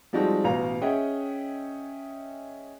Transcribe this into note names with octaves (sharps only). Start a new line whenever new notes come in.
F3 G3 G#3 C4 D#4 F#4
A1 B2 F5 A#5 F7
C#4 G#4 D#5 E5 F#5 G5